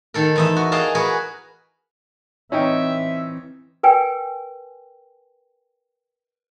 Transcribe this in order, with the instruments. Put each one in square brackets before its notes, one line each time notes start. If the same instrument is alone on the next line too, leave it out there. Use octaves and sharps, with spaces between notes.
[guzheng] D#3 A4 A#4
E2 D#5 E5
F#4
G#4 A#4 D#5 F5 A5
F#4 G#4 A#4 B4
[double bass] E3 C4 [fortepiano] C#4 D#4 G5 [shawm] E5
[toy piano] A#4 B4 G5 G#5